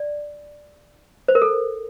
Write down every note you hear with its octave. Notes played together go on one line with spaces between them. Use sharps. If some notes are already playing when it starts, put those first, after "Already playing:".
Already playing: D5
C5
A#4
A4